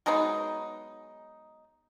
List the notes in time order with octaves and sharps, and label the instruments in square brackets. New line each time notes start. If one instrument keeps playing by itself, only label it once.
[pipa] F#3 G#3 B3 D#4